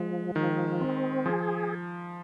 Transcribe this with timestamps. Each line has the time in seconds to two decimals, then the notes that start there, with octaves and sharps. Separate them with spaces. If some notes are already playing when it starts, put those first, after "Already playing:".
Already playing: F3 G#3
0.35 D#3 F3
0.81 C4
1.26 F3 G#4